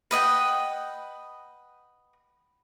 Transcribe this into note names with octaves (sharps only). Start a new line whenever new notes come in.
B4 D#5 F#5 G5